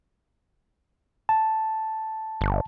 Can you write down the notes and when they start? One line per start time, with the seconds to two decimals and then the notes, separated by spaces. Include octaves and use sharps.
1.29 A5
2.41 G1